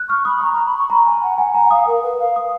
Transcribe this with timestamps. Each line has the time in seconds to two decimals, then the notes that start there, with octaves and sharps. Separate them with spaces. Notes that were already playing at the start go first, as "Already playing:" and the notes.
Already playing: F#6
0.08 C#6 F6
0.25 B5 D#6
0.41 A#5 C#6
0.53 A#5
0.66 B5
0.77 C#6
0.90 A#5 B5
1.05 G#5
1.23 F#5
1.38 F#5 G#5
1.54 F#5 A#5
1.66 F#5
1.71 F5 D#6
1.87 A#4
2.03 B4
2.19 F5
2.36 D#6